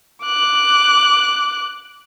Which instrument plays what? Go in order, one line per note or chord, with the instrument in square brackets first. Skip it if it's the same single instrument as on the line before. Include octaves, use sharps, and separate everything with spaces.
[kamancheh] D6 F#6